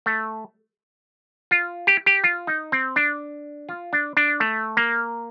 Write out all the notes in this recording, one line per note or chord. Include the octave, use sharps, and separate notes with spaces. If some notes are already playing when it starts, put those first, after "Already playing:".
A3
F4
G4
G4
F4
D#4
C4
D4
F4
D4
D4
A3
A#3